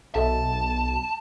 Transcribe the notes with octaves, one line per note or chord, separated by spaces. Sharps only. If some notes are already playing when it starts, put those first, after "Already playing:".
B1 A4 D#5 E5 A5